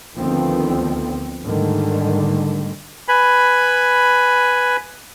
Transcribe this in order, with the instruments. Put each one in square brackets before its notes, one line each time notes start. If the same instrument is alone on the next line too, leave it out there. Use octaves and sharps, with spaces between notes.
[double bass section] D2 D3 D#3 F3 B3 C4
G#2 D3 D#3 G3 A3
[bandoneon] B4 G#5 B5